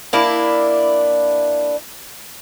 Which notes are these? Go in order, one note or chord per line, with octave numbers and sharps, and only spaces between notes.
A#3 D4 E4